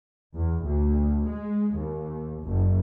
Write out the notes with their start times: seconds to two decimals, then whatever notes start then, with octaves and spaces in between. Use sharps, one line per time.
0.35 E2
0.64 D2
1.26 G#3
1.75 D#2
2.43 F#1